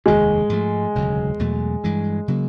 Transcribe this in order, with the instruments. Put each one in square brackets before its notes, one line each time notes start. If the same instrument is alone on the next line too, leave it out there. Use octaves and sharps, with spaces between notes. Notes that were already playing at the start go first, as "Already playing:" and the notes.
[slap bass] F1 D#2 D#3 [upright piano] G#3
[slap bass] G#2 F3 A3
E1 D2 C#3 F#3
E2 B2 F#3 A3
G2 E3 G#3
C#3 F#3 A#3